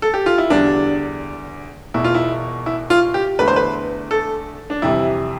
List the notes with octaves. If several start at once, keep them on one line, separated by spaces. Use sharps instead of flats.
A4
G4
F4
E4
E2 D3 G3 D4
E1 E2 B2 E4
F4
E4
E4
F4
G4
E2 D3 A3 B4
C5
B4
A4
D4
F2 C3 E3 G3 E4